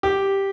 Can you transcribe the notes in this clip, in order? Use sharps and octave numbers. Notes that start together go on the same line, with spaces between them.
G4